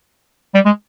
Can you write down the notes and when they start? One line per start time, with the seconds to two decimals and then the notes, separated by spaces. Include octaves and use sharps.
0.54 G3
0.65 G#3